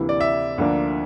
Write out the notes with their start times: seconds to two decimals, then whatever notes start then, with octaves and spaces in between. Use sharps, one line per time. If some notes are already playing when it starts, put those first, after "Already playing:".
Already playing: D2 C3 E3 A#3 E4
0.09 D5
0.21 E5
0.58 D2 D3 F3 A#3 D4